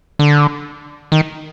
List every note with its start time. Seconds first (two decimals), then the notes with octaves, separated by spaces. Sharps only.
0.19 D3
1.12 D#3